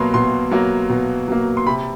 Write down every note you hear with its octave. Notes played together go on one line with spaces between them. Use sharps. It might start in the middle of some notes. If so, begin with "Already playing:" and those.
Already playing: B2 F#3 A#3 B5 C6
B2 C6
F#3 A#3
B2
F#3 A#3
C6
C3 B5